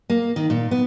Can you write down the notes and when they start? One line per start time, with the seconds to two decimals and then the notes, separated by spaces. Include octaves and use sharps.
0.10 A#3
0.36 D#3
0.50 A#2
0.71 B3